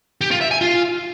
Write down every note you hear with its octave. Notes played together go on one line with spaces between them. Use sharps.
G4
F4
E5
G#5
F4